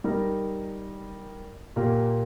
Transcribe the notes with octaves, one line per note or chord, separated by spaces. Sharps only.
G3 D#4 A#4
A#2 A#3 G4 A#4